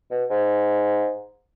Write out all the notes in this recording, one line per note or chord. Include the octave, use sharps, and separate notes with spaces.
B2
G#2